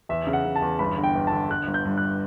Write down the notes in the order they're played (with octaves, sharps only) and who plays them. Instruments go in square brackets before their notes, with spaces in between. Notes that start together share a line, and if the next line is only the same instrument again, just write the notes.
[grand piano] E2 E5
C#3
F#5
C#3
A5
E2
G1 B5
D3
G5
G1
D3 A5
D3 F#6
G1
G6
G2
F#6